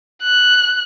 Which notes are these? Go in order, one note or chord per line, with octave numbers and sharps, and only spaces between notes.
F#6